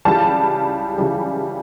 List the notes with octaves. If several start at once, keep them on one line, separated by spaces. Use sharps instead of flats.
C#2 C#3 E3 G3 A5
C#2 C#3 E3 G3